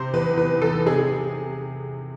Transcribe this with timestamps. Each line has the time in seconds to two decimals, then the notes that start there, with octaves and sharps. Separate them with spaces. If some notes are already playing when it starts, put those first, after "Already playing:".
Already playing: C3 C5
0.13 E2 B4
0.37 E2 B4
0.62 E3 A4
0.86 C3 G#4
0.98 G#4